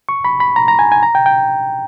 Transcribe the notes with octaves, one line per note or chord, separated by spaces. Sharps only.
C#6
B5
B5
A#5
A#5
G#5
G#5
A#5
G5
G5